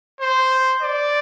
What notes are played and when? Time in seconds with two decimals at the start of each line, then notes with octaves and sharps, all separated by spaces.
0.20 C5
0.82 D5